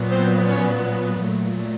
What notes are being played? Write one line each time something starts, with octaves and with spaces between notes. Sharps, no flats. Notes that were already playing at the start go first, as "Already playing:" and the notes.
Already playing: A#2 F#3 B3
C4 C5
C#4 C#5
A#2 F#3 A3